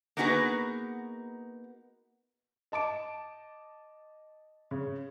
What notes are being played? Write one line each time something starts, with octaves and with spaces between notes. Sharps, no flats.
A#3 B3 D#4 F#4 G#4 B4
D#5 A5 D6 D7
C#3